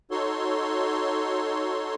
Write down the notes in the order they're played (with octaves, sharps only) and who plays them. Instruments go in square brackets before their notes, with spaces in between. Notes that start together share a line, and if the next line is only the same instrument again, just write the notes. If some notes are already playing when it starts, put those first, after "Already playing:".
[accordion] D#4 F#4 A4 C#5 C6